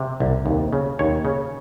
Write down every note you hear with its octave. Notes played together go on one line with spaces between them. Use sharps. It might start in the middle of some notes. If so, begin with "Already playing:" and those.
Already playing: C3
C2
D#2
C#3
D#2 C#5
C#3